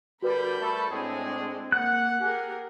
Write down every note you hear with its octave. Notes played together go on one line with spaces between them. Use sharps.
D3 G3 F#4 A#4 B4 B5 G6
G3 A3 A4 G7
A2 G#3 C4 D4 G#4
A#3 F#5 F#6
G4 G#4 A#4 G#5